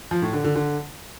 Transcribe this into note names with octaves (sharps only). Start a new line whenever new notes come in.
F3
A2
D3
D3
D3